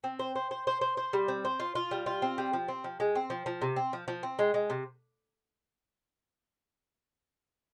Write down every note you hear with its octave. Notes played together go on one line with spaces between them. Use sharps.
C4
C5
C5
C5
C5
C5
C5
G3
C4
C5
F4
F4
G3
F4
C4
G3
F3
C4
F3
G#3
C4
F3
F3
C3
C4
F3
F3
C4
G#3
G#3
C3